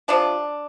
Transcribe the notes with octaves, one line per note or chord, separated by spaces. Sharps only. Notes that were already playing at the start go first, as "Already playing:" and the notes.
C3 F3 A3 D4